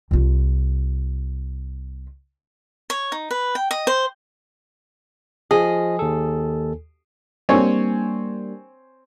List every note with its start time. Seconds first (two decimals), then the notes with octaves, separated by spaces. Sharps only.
0.11 C2 F4
2.90 C#5
3.12 D#4
3.31 B4
3.55 G5
3.71 D#5
3.87 C5
5.51 F3 G#4 D#5
5.99 D#2 A4
7.49 G3 A#3 C4 D4 C#5 G#5